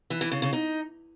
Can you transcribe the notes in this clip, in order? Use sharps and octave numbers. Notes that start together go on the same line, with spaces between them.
E3
E3
C#3
C#3
D#4